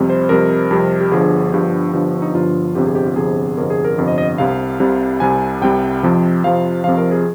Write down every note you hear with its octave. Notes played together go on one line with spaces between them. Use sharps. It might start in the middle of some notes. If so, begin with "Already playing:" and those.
Already playing: F2 C3 G3
C5
F2 C3 G3 A#4
F2 C3 G3
G4
G1 G2 F3 G#4
G1 G2 F3 G4
G1 G2 F3
D#4
G1 G2 F3 F4
G1 F2 C3 G4
G#4
G4
F4
G1 F2 C3 G#4
G1 F2 C3 A#4
G#4
A#4
G1 F2 C3
D#5
D#5
C2 C3 G3 F5
C2 C3 G3
C2 C3 G3 G#5
C2 C3 G3 G5
F2 C3 F3
F2 C3 F3 F5
F2 C3 F3 F5
A#4
G#4